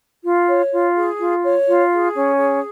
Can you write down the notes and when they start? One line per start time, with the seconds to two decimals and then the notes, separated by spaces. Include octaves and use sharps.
0.24 F4
0.47 C#5
0.72 F4
0.96 G#4
1.20 F4
1.43 C#5
1.69 F4
1.92 G#4
2.16 C#4
2.39 G#4